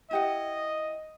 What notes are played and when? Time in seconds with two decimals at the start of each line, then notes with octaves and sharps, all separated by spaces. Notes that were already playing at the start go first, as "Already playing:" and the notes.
0.11 E4 G4 D#5 F#5